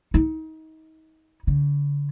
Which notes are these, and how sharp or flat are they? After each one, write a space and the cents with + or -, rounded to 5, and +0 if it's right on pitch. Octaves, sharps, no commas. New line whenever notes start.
D#4 +30
D3 -40